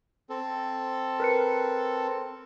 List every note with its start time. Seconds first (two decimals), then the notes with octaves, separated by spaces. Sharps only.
0.30 C4 A4
1.20 A#4 B4 C#7